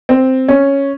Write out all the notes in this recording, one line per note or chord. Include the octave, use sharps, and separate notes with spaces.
C4
C#4